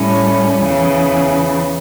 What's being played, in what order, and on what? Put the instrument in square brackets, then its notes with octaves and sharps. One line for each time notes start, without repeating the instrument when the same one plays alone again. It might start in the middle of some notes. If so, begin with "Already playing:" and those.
Already playing: [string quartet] A2 G3 C#4
E2 C#3 E3